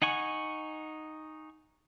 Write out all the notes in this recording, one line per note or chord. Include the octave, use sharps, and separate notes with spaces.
D#4 F#5 G#5 C#6